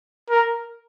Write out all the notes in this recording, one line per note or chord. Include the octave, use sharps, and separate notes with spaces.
A#4